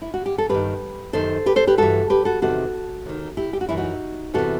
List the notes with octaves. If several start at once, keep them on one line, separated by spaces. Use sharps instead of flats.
E4
F#4
G4
A4
G2 D#3 G4 B4
F#2 D#3 A4 C5
G4 B4
A4 C5
G4 B4
G2 E3 F#4 A4
G4 B4
F#4 A4
E2 C3 D#3 F#4 A4
D#2 D#3
E4 G4
G4
F#4
F#2 E3 E4
D#4 F#4
E2 C3 E3 F#4 A4